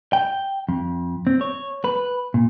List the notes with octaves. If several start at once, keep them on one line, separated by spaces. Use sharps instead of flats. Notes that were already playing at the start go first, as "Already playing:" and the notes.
G5
F2
C4
C#5
B4
A#2